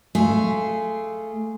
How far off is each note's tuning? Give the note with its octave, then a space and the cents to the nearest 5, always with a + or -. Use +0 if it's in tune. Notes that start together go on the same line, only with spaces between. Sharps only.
A3 +0 F4 -20 G#4 +0